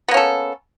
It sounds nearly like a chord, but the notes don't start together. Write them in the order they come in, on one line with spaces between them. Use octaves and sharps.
B3 A#3 C#4 A4